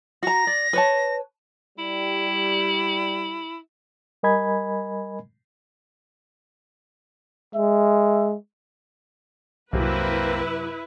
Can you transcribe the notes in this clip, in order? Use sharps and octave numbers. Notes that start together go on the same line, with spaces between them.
F#4 A#5 A#6
D5
B4 C#5 A5
G3 E4
G3 A#4 D#5 G#5 B5 G#6
G#3 E5
C2 F#2 C3 A#3 C4 E4 B4